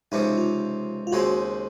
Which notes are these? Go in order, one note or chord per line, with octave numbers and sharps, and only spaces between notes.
C#2 C3 F3 D#4
F4
F4
D#2 C#3 G#3 C4 F#4